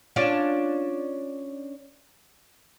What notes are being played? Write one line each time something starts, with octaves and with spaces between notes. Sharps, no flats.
C#4 D4 F4